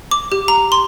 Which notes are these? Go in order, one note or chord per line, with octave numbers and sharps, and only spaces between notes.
D6
G4
A#5
C6